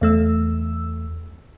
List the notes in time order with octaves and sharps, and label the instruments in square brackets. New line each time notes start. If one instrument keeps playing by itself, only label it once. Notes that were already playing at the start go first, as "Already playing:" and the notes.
[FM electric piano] E2 A3 E6